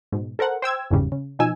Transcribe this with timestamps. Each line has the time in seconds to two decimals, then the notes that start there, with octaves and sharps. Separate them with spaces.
0.12 G#2 B2
0.39 A4 A#4 C5 F#5
0.62 C5 G5 E6 G#6
0.91 G1 E2 G#2 C#3 G3
1.12 C#3
1.39 B2 F3 D#4 G#5 E6